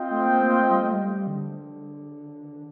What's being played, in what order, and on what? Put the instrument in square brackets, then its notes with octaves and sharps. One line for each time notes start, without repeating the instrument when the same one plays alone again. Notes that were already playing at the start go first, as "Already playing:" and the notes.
Already playing: [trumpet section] C4 F4 C5 D#5 G5
[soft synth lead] A3
A#3
A#3
A3
G3
A3
G3
D3